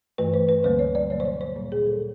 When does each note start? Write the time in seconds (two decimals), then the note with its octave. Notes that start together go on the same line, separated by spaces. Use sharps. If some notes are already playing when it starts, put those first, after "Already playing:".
0.18 G2 E3 A3 B4
0.34 C5
0.49 B4
0.64 D2 D3 G3 A#3 C5
0.79 C#5
0.95 D5
1.10 B2 F#3 A#3 C#5
1.20 C5
1.25 C#5
1.41 C5
1.56 A#2 G3 A#3
1.72 G#4
1.87 A4